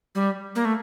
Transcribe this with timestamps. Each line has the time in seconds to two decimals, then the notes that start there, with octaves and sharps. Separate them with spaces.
0.15 G3
0.55 A#3
0.65 A3